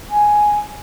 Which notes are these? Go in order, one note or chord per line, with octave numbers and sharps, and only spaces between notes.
G#5